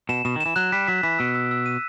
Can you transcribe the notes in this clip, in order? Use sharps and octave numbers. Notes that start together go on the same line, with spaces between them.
B2 E7
B2 E7
D#3
E7
E3
F#3 F#6
G3 B6
F#3 B6
E3 B6
B2 E6
E6
E6
D#7